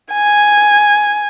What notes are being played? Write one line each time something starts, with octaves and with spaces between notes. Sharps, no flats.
G#5